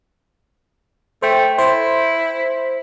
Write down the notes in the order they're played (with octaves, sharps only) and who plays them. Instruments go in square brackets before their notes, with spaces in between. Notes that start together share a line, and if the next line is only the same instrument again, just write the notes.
[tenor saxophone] A3 [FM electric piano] C5 G5
[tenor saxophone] E4 [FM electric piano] C5